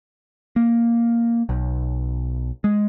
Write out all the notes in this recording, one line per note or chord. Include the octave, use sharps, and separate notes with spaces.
A#3
B1
G#3